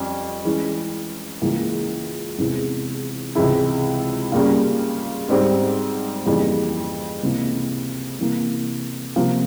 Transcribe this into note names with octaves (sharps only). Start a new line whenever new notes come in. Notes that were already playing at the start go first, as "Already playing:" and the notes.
Already playing: F2 G3 C#4
E3 G#3 C#4
C#2 C#3 E3 A#3
E2 C3 E3 G#3
C#2 C3 E3 G#3 E4
C#3 G3 A#3 C#4 F4
G#2 G3 C4 G4
F2 C#3 E3 G3 A#3
C#2 C3 E3 A#3
C3 E3 A#3
C3 F3 A#3 F4